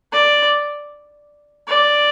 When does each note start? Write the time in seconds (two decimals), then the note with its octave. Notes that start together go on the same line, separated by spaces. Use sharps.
0.12 D5
1.68 D5